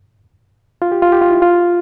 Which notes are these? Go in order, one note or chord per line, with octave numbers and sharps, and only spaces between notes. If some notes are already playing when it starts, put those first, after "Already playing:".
F4
G4
F4
G4
F4
E4
F4